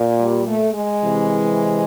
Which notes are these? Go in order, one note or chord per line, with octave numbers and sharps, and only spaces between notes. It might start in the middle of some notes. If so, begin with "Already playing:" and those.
Already playing: A#2
G3
A3
G#3
C3 E3